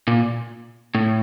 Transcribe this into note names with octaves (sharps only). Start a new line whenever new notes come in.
A#2
A2